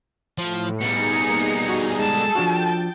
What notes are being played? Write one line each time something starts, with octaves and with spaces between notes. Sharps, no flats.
A2 F3
B2 G3 D#4 G#4 A#5 C#7
A#3
F#4
G#3 G#4 A4 A5
F3 D4 F#4 G5 A6